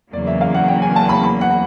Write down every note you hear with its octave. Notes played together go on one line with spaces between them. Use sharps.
E2 C#3 F#3 A#3 D5
E5
F5
F#5
G5
G#5
A5
B5
B5
F#5